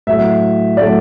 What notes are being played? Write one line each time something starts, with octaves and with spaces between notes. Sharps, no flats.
A2 F#3 A3 E5
A2 F#3 A3 D5